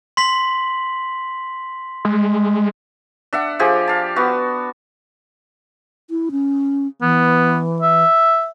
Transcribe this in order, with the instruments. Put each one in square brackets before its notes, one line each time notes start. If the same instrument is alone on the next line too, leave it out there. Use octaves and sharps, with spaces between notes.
[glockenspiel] C6 B6 F#7
[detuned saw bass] G#3
[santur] D4 E5 F#5
F3 G4 G#4 D5
F5 A5
B3 F#4
[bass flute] E4
C#4
[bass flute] E3 [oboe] B3
[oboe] E5